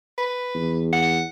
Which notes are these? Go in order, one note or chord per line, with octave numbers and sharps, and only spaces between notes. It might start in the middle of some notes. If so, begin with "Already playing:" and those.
B4
E2
F#5